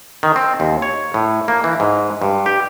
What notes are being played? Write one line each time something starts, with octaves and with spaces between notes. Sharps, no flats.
D#3
C4
D#2
C#5
A2
A#3
E3
G#2
G2
G4